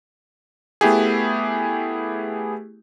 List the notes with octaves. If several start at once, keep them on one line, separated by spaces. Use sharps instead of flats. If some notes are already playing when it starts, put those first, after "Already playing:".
A3 B3 E4 G4 G#4